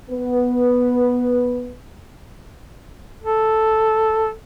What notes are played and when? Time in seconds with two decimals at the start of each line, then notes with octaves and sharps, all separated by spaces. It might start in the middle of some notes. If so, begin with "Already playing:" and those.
0.10 B3 B4
3.22 A4